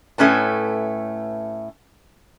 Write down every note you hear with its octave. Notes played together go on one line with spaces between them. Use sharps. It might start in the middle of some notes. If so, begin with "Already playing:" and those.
A2 A3 C#4 B4 A5